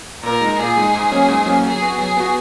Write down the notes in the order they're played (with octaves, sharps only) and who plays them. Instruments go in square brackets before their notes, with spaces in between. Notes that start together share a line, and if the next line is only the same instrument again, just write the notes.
[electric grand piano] A#2 [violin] A#4
[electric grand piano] G#3 D#4
[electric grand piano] A#2 [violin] G#4
[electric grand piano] G#3 D#4
G#2
F#3 A#3 C#4
G#2
F#3 A#3 C#4
[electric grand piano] F#3 [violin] G#4
[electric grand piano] B3 F#4
[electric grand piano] F#3 [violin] G#4
[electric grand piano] B3 F#4